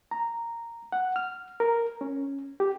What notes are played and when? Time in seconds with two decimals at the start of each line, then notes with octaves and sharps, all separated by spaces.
0.11 A#5
0.92 F#5
1.16 F6
1.60 A#4
2.01 C#4
2.60 G4